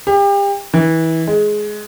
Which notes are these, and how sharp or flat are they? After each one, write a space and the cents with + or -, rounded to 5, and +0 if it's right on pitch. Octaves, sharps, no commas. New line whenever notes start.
G4 +35
E3 -25
G#3 +15